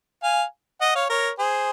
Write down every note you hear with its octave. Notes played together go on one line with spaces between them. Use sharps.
F5 G#5
D#5 F#5
C#5 F5
A#4 C#5
G#4 C5